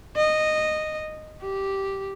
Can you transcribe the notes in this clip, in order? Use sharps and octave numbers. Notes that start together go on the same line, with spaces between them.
D#5
G4